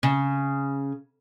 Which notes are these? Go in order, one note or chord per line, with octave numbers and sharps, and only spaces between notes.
C#3